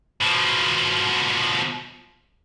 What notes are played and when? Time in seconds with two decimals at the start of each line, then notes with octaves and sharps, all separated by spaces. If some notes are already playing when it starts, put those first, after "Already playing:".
0.21 B2 F3